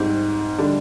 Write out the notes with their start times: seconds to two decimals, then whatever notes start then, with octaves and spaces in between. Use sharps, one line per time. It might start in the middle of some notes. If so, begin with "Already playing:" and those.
Already playing: G#2 G3 C4
0.58 D3 G3 D4